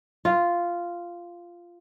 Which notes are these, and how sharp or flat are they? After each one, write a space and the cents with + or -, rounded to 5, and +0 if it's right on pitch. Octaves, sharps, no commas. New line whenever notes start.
F4 -5